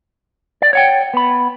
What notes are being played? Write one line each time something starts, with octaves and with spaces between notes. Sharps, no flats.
D5
C#5 F#5 G5
B3 B5